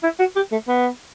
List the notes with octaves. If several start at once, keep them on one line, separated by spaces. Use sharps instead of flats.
E4
F#4
G4
A3
B3